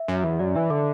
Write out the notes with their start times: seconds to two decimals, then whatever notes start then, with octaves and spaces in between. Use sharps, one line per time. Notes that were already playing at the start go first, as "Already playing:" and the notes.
Already playing: E5
0.08 F#2
0.24 E2
0.39 F#2 D5
0.55 E3 E5
0.70 D3 D6